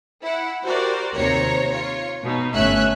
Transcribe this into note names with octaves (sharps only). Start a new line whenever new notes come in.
E4 F#5
F#4 G4 A#4 C5 D5
D#2 C3 C5 C#5 A#5
F4 C#5
B2 D#4
G1 A3 C#4 E5 F#6